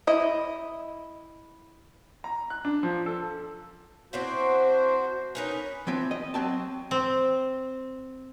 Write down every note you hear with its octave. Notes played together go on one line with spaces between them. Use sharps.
E4 D#5
A#5
F#6
D4
F3
A4
C4 D4 E4 F#4 C5
C#4 D#4 A#4 B4
E3 F3 C4
D#5
F#3 A#3 C4 A5
C4